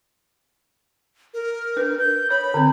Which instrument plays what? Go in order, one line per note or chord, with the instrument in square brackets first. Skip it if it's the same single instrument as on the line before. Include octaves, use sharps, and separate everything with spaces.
[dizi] A#4
[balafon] D4 B4
[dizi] G6
[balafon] C#5 [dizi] B5
[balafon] D3 C4